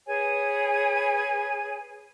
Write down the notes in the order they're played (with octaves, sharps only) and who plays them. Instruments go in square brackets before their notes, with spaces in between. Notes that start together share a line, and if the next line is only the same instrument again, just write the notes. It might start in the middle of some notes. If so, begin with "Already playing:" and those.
[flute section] G#4 B4 C#5 G#5